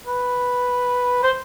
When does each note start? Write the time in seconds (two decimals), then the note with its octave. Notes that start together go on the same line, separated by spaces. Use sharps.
0.07 B4
1.23 C5